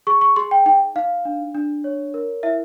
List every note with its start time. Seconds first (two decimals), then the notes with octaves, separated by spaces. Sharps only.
0.07 G#4 C#6
0.21 C#6
0.36 G#4 C6
0.51 G5
0.66 D#4 G5
0.96 D#4 F5
1.25 D4
1.55 D4
1.84 C#5
2.14 A#4
2.43 E4 E5